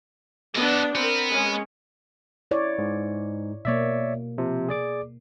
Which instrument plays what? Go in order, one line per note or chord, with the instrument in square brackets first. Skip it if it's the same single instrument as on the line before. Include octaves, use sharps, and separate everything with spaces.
[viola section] B3 D4 [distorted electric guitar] A4 D#5
[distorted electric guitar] B3 [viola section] C4 A#4
[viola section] G#3 C#4
[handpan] E4 C#5 D5
[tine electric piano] G#2
[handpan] B2 A#3 [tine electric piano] C#5 D5 E5
[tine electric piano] C3 F3
G#4 D5 D6